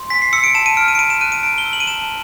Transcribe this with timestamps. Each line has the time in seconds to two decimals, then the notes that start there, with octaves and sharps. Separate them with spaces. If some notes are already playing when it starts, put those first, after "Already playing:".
Already playing: C6
0.10 G#5 B6
0.22 C7
0.33 E6 C#7
0.44 D7
0.55 A5 E7
0.66 D#7
0.77 F6 D7
0.88 D#7
0.95 D7
0.99 B5 D#7
1.10 E7
1.21 F#6 D#7
1.32 D#7
1.43 A#5 D7
1.58 G7
1.65 E6
1.73 F#7
1.80 D#7
1.87 A5 E7